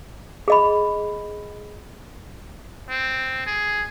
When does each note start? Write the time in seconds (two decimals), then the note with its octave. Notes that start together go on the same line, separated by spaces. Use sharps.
0.48 G#4 D#5 B5
2.89 C4
3.47 G#4